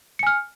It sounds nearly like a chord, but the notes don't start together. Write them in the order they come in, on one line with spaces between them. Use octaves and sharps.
C#7 G#5 F6